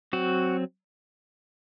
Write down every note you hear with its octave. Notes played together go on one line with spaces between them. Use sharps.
F#3 C4 F#4